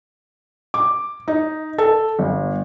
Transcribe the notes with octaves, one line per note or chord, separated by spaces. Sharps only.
D6
D#4
A4
G1